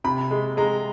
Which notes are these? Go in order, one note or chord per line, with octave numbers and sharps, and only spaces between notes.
C3 B5
G#3
G#3 A#5